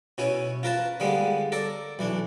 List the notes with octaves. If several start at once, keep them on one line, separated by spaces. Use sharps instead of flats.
B2 C#4 E4 C#5
F4 A#4 B4 A5
D3 G3 G#3 A#3 B3
A4 A#4 D5
B1 E3 D4